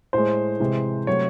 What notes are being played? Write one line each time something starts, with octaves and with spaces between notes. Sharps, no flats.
A2 G#3 C5
C3 E3 G#3
C3 F#3 A3 C#5